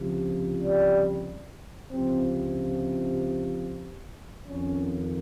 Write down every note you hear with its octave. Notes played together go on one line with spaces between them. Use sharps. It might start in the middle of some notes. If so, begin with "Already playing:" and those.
Already playing: C#2 C3 F3
G3
C#2 C3 F3 C4
F2 D#3 C#4